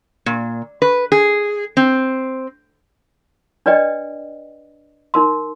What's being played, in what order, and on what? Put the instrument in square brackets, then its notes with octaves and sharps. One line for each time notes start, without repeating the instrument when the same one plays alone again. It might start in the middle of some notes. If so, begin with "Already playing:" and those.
[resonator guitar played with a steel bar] A#2
B4
G#4
C4
[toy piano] D4 B4 D5 D#5 G5
D#4 A#4 C6